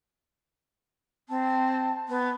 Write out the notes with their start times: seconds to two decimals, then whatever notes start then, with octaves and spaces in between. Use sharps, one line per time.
1.29 C4 A5
2.08 B3